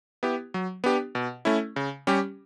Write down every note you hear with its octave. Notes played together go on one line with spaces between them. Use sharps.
B3 E4 G4
F#3
B3 D4 G4
B2
A3 C#4 E4
C#3
G3 C#4 G4